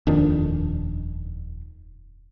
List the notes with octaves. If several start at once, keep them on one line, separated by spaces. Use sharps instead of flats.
D#1 F2 D#3 D4